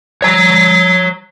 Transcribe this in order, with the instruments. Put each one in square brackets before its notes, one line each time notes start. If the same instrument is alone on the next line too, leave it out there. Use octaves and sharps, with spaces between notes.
[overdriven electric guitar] C#5 A#5